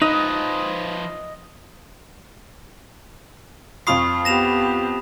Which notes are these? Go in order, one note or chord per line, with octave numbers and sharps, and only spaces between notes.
F3 D#4 B4 D#5
F2 F4 B5 C#6 D#6 C7
B3 G4 A#6 E7 F7